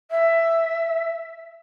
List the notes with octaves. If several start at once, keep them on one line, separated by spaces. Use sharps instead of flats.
E5